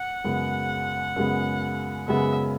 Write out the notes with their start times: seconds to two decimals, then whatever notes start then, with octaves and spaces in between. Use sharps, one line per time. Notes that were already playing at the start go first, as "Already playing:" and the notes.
Already playing: F#5
0.24 F#2 C#3 G#3 B3
1.16 F#2 C#3 G#3 B3
2.07 F#2 C#3 G#3 B3 E5